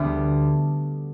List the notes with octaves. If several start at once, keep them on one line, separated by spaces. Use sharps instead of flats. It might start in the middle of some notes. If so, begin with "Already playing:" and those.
Already playing: D2 D3 G3 B3